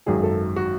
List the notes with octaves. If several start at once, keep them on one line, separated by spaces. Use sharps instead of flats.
G#1 F#2 D#3 F#3 G#4
A4
F#4